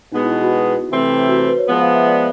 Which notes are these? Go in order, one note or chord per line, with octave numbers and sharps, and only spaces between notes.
B2 G#3 B3 D#4
E4
F4
F#4
C3 E3 A3 C4
F#4
C5
B4
C#5
F3 G#3 B3
F5
E5
D5